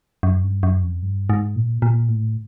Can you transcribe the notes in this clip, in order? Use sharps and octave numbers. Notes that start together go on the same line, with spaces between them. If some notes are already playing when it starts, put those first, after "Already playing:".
F#2
G2
F#2
F2
G2
G#2
A#2
A#2
A2